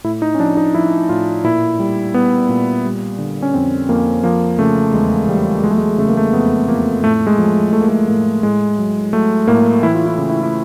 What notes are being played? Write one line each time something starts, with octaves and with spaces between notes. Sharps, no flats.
A2 E4
D#4
C#4
F3 D4
D#4
F3 E4
A2 F4
A#2 E4
G3
G3 B3
A#2
G3
D3
C#4
F2 C4
F2 A#3
F3 A#3
C#3 A3
E2 G#3
E2 G3
F#3 G#3
A3
G#3
C#3 A3
A#3
A3
F2 B3
F2 A#3
A2 A3
G#3
F3
F3 A3
A#3
A3
A2 A#3
A2 G#3
F#3
F#3 A3
A2 A#3
E3 E4
F4
E4
C#3
E4
E4